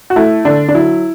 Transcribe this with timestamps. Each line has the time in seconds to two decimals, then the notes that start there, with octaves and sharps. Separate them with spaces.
0.10 F#4
0.16 A3 E4
0.45 D3 D4
0.69 D4
0.74 F#3 E4